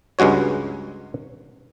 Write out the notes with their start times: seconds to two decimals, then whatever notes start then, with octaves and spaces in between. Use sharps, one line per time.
0.19 C#2 G2 G#3 F#4 C#5